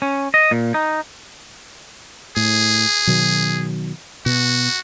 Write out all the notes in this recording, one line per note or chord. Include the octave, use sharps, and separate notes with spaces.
C#4
D#5
A#2
D#4
A2 G#4
B2 D#3 F#3
B2 F#4